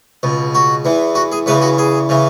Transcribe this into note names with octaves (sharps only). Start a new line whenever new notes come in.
C#2 B2
F#4
E2 E3
F#4
G#4
E2 C#3 E3 B4
F#4
G#4
C#3 E3